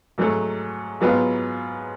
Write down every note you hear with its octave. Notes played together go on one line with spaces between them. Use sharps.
G#2 F#3 A3
G#2 F#3 B3 F4